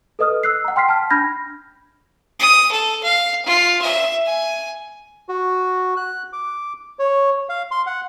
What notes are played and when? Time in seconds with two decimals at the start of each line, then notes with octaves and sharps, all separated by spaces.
0.19 A4 B4 D#5 D#6 F6
0.43 E6 F#6 C7
0.65 F#5 A#5
0.76 G5 C6 F6 B6 C7
0.88 A5 F6
1.10 D4 B5 F6 G6 G#6 A#6
2.39 D#6
2.72 A4
3.03 F5
3.45 F4
3.81 E5
4.25 G#5
5.29 F#4
5.97 F#6
6.33 D6
6.99 C#5
7.49 F5
7.71 C6
7.87 F#5